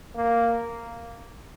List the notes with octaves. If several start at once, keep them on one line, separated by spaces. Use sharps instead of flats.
A#3